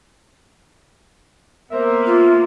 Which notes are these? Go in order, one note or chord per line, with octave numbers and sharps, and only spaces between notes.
A#3 B3 A#4 C5 E5
F4